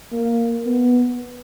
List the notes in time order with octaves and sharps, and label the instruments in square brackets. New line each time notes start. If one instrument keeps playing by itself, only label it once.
[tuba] A#3
B3